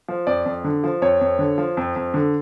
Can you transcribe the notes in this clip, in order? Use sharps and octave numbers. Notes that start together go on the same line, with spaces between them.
F3
F2 D5
F2
D3
F3
F2 C#5
F2
D3
F3
F2
F2
D3